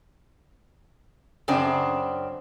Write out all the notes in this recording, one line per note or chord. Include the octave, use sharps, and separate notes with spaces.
F#2 C#3 C4 D4